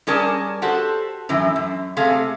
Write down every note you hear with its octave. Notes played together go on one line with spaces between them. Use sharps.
G3 C#4 G#4 A#4 D5 A5
F#4 G4 A4 C5 F#5
F#2 A2 E3
F#2
C3 A3 G#4 A4 F5